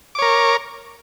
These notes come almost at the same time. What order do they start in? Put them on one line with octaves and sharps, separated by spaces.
D6 C#5 A#4